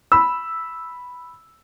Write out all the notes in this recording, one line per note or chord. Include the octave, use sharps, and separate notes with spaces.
B5 E6